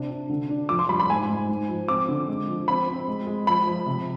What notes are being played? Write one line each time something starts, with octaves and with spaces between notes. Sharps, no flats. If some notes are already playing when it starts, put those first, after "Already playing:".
Already playing: C3 D4
D4
D3
D4
F2 D6
C6
G3 B5
B5
G#2 G#5
G#2
G#2
F3
C4 D6
D3
G#3
F3
C4 B5
C4
G#3
G#3
F3 B5
F3
C3